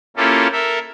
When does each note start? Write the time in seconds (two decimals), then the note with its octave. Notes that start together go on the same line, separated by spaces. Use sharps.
0.17 A#3 C#4 E4 F4 G4 A4
0.52 A4 A#4 E5